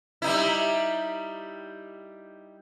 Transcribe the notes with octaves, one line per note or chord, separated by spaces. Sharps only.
G3 D#4 E4